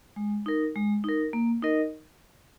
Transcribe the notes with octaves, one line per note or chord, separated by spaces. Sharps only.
G#3
D#4 A#4
G#3
D#4 A#4
A#3
D#4 A#4 D#5